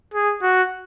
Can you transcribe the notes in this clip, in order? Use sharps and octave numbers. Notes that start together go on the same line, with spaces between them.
G#4
F#4